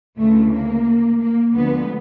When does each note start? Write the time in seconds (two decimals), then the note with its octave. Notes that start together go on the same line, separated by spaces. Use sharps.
0.17 D2 C#3 E3 A3
0.51 A#3
1.19 A#3
1.54 D2 D3 F3 G#3 B3